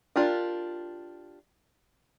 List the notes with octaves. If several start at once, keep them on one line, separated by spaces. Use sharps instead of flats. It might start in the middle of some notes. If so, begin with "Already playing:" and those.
D4 F4 G4 A#4